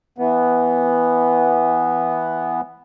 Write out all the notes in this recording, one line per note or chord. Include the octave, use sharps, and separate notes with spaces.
E3 B3